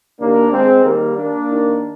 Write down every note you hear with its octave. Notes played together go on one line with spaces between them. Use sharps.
D#2 D#3 A#3 D4
G#3 C4
D#2 D#3 G3 A#3
A#3 D4
D#2 D#3